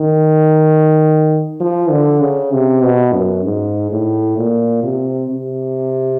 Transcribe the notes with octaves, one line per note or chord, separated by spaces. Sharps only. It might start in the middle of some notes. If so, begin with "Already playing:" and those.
Already playing: D#3
F3
D3
C#3
C3
B2
F#2
G#2
A2
A#2
C3
C3